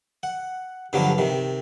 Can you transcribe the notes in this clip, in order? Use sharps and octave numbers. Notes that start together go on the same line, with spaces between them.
F#5
G2 D3 F3 F#3 B3 F4
C3 D#3